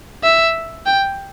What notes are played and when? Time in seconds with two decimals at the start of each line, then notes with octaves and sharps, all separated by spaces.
0.23 E5
0.86 G5